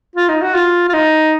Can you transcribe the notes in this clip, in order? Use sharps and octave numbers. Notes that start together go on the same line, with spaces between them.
F4
D#4
F#4
F4
F4
D#4